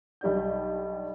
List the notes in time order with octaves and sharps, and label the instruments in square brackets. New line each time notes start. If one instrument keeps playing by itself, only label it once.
[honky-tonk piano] B1 G3 D4 G6